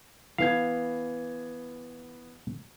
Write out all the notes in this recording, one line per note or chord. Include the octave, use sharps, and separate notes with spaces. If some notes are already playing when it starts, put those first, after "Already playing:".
E3 B3 F5 G#6